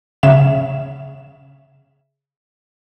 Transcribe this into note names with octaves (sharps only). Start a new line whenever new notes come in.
C#3 E5 E7